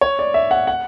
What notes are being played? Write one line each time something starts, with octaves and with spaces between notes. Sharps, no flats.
C#5
D5
E5
F#5
F#5